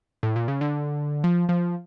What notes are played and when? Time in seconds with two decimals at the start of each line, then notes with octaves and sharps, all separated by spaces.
0.23 A2
0.36 A#2
0.48 C#3
0.61 D3
1.24 F3
1.49 F3